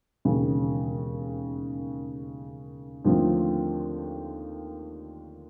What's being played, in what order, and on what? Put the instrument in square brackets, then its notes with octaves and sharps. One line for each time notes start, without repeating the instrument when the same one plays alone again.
[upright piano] E1 D#2 C#3
D#2 D3 F3 A3 C4